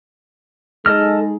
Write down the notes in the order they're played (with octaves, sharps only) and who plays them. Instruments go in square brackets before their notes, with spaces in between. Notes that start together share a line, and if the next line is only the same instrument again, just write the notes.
[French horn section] G#3 D#4 G#4 [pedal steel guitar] A4 D#5 F6